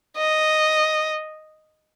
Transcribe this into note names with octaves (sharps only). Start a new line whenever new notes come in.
D#5